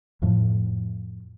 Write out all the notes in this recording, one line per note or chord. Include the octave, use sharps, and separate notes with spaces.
F2 A2 F3